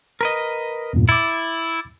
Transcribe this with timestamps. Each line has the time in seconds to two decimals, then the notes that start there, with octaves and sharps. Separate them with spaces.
0.21 A#4 B4 D#5
0.93 E2 G2 A#2
1.09 E4 D6 A6